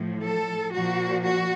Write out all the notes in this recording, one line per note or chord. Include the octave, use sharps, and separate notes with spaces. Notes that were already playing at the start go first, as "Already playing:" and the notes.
Already playing: A2 F3
A4
A#2 F3 F#4
F#4